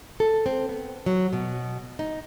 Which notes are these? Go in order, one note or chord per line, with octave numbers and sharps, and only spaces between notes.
A4
C4
B3
F#3
B2
D#4